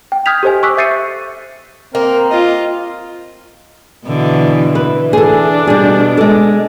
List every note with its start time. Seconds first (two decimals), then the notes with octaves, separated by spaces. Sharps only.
0.12 G5
0.26 D#6 F6 G6 G#6 B6 F7
0.43 G4 A4 C5 D#5 G#5
0.63 C#6 D6 E6 F#6 B6
0.77 E5 G6 A6 C7 C#7 D#7
1.95 A#3 C4 A#4
2.31 F4 D#5
4.06 B2 D3 E3
4.75 E3 B4
5.13 D4 G#4 A4
5.67 B2 G3 G#4
6.17 G#3 A4